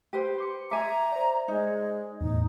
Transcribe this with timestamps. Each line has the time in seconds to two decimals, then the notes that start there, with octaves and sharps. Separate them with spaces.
0.13 G4 B4 C5
0.38 C6 D6 C#7
0.71 E5 G#5 A#5 D6 G#6
1.12 C5 D5
1.48 G#3 D#4
2.21 E2 A2 D#4